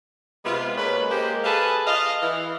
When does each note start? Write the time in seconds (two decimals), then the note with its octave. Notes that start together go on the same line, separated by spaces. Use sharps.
0.45 C3 G#3 B3 F4
0.77 G#3 A#3 C#4 B4
1.11 G#3 A#3 G4 A#4 C5
1.44 G#4 A4 B4 F5 A5
1.87 D#5 F5
2.22 E3